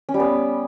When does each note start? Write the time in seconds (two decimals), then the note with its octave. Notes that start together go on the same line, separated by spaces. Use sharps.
0.09 C#4
0.14 G3
0.20 B3